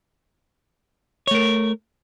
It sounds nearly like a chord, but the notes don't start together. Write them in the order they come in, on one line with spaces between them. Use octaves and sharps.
C#5 A3 A#4